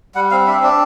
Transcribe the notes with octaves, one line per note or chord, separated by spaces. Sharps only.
G3 F#5
C4 F5
D4 E5
D4